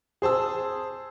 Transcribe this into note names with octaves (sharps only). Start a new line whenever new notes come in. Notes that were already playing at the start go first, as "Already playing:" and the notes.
G#4 C5 A5 E6